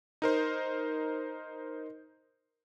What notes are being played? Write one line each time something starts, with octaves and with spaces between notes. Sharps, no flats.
D#4 A#4 C5